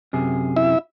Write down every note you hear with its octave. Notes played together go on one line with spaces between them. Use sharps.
F#2 C3 G#4
E4 E5